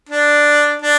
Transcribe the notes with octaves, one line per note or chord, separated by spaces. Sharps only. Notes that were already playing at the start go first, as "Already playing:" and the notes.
D4
D4